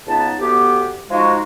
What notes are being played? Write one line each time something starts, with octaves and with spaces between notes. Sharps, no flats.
C#2 B3 D#4 A5
D2 B3 G4
F3 G#3 D#4 F#4